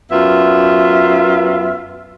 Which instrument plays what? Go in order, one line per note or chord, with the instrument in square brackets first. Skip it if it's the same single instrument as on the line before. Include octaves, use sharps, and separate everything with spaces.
[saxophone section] F#2 B3 F4 E5